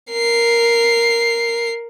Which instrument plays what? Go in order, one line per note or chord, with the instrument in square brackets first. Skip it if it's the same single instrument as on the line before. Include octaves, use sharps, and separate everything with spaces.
[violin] A#4 C7